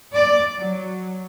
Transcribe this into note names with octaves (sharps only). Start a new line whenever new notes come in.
D5
F#3